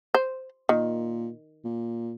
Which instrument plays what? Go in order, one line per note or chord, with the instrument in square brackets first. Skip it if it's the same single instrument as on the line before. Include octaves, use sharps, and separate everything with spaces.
[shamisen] C5
[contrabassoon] A#2 [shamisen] D#3
[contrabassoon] A#2